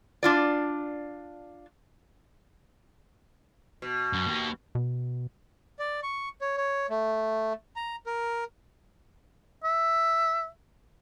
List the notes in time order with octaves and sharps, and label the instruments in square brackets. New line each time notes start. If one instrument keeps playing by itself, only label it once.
[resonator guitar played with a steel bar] D4 F4 D5
[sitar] B2
[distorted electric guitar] F#2
A#3 G4
[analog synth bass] B2
[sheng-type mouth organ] D5
C#6
C#5
C#5
A3
A#5
A#4
[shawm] E5